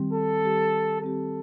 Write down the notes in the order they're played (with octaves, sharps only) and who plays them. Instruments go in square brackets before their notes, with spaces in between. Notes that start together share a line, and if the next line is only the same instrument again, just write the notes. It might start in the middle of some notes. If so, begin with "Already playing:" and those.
Already playing: [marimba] D#3 G3 C4 G4
[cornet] A4
[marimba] D#3 G3 C4 G4
[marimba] D#3 G3 C4 G4 [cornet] A4